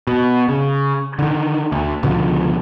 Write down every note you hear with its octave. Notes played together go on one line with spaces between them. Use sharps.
B2
C#3
D3 D#3
D2
C#2 B2 D3 F3